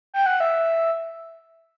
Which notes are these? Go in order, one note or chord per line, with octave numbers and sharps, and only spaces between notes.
G5
F#5
E5